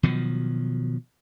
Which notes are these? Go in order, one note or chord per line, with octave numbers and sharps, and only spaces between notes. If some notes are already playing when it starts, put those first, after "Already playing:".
B2 D#3 F3 F#3